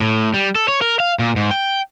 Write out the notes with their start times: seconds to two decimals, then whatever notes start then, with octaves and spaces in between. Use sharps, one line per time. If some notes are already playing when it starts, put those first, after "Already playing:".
0.01 A2
0.34 G3
0.55 A4
0.68 C#5
0.82 A#4
1.00 F5
1.19 A#2
1.36 G#2
1.51 G5